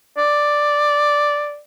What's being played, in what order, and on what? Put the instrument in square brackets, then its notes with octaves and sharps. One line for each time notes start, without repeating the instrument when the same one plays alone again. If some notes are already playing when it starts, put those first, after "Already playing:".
[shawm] D5